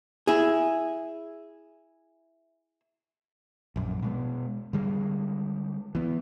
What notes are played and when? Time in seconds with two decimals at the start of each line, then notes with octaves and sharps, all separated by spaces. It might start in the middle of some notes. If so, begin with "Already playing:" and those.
0.27 E4 G#4
3.76 A#1 F#2
4.02 B2 G#3 B3
4.73 D3 G3 G#3
5.95 E3 B3